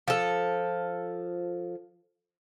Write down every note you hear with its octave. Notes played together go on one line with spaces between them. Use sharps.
F3 A4